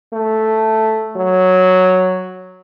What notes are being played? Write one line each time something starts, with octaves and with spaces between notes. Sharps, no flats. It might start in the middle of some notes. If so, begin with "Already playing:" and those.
A3
F#3